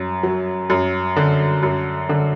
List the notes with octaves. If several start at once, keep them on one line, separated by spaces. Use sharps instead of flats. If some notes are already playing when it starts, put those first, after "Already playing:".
Already playing: F#2
F#3
F#2
D3
F#2
D3